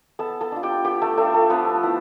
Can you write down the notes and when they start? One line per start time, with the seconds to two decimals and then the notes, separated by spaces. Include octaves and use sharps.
0.19 B3 A4 A5
0.41 A4 A5
0.52 D4 F4
0.63 G4 G5
0.85 B3 G4 G5
1.02 A3 A4
1.17 A3 D4 F4 A4
1.34 A3 A4
1.50 F3 B3 B4
1.83 B3 E4